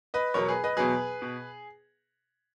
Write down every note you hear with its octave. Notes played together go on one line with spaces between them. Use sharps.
B4 D#5
E2 B2 F#3 A#4 C#5
G#4 B4
B4 D#5
E2 B2 F#3 G#4 B4
B2